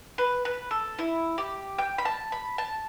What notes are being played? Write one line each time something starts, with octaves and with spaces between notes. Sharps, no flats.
B4
B4
A4
E4
G4
G5
B5
A5
B5
A5